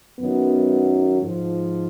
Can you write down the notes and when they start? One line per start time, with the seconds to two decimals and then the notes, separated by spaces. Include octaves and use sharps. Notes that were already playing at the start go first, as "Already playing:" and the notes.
0.19 F#2 D#3 F#3 B3
1.22 G#2 F3